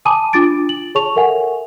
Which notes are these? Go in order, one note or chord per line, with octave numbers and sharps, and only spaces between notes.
G#5 A5 B5 D6 D#6 D#7
D4 F4 D6 A6 D7
F#7
G#4 C#5 A5 C#6 F7
A4 A#4 E5 F#5 G#5